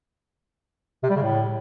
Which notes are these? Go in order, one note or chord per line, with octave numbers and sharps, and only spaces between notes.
C3
G3
C#3
A2